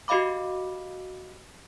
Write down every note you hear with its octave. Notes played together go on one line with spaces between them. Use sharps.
F#4 G4 D#5 F5 B5 D6